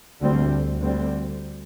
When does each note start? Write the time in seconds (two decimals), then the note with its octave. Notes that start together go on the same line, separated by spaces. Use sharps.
0.21 D2 D3 G3 C4
0.81 D2 D3 G3 C4